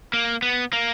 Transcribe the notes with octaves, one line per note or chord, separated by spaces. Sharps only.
A#3
B3
A#3